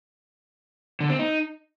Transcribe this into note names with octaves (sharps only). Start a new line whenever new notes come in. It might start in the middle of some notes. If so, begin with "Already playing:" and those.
D3
C4
D#4